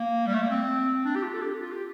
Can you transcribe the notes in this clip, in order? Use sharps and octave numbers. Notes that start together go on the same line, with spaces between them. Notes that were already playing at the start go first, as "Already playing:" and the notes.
Already playing: A#3
G3
A3
A#3
C4
D4
G4
F4
A4
G4
F4
G4